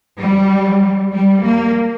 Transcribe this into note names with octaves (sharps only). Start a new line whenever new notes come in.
G3
G3
A#3